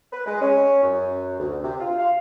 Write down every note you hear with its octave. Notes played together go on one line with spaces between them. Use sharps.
B4
G#3
C#4
F#2
D2
C3
F4
F5